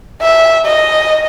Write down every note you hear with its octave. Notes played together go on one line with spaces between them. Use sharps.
E5
D#5